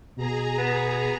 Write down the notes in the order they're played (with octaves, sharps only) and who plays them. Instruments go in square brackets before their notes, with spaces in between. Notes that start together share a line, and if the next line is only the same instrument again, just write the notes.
[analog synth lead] B2 [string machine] G#4 A#5
[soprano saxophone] B3